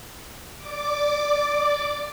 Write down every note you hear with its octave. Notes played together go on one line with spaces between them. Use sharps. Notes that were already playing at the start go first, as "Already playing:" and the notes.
D5 D6